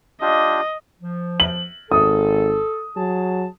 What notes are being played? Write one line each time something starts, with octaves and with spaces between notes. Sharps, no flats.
D4 F4 G4 D#5
F3
F#7
G#1 A4 D#6
F#3 G#4 A5